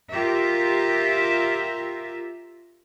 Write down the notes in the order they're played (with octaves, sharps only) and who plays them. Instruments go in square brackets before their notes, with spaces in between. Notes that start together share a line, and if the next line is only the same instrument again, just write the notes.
[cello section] F4 G4 A#4 E5